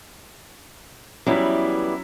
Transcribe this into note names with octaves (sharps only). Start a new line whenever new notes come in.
E3 F#3 G3 B3 C#4 E4